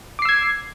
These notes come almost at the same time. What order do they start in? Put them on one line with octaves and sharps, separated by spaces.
D6 C7 E6 G#6